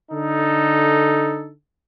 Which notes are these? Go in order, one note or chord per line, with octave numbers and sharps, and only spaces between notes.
D3 D#4 A4